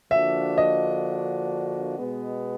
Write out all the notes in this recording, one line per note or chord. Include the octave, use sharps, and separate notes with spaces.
D3 F3 A#3 D4 F#4 E5
D#5
B2 G#3 B3